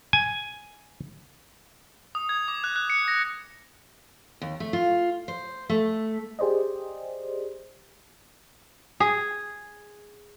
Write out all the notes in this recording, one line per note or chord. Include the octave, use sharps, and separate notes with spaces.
G#5
D#6
G#6
D6
F#6
F#6
C#7
A#6
D#2
A3
F4
C5
A3
G4 G#4 C5 D5 D#5
G#4